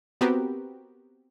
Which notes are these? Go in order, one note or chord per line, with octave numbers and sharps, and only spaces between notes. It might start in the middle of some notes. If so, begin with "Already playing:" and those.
B3 C4 F#4 G4 A#4 B4